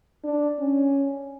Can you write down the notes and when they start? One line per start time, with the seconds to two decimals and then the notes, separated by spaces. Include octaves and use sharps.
0.24 D4
0.59 C#4